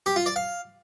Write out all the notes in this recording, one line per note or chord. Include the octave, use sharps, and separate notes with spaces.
G4
F4
D5
F5